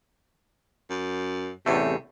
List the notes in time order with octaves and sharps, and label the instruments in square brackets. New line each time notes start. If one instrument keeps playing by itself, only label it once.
[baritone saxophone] F#2
[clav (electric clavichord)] A1 E2 A3 [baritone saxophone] C3